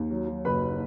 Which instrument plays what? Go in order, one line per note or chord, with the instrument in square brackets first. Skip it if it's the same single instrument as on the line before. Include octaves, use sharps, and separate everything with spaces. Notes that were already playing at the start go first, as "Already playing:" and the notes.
Already playing: [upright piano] D#2
F#3
F#3
F#1 B4 B5